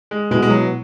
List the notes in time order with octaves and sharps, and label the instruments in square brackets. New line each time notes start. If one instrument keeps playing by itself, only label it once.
[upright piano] G#3
[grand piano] B2 B3 E4 [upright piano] G#3
[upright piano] G#3
F#3